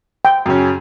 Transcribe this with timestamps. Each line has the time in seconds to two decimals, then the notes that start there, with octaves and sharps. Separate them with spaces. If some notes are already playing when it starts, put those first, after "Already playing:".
0.25 G5
0.46 F#2 C#3 C#4